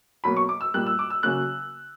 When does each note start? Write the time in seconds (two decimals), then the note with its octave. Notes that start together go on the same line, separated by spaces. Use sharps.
0.24 B2 F#3 A#3 B5
0.37 C#6
0.49 D6
0.61 E6
0.74 A#2 G3 A#3 F#6
0.87 E6
0.99 D6
1.10 E6
1.23 C#3 F#3 A#3 F#6